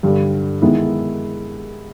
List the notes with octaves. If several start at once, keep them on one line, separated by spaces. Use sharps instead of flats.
G2 D3 G3
D#3 G#3 B3 E4